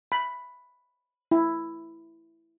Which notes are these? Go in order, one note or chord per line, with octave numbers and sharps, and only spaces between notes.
B5
E4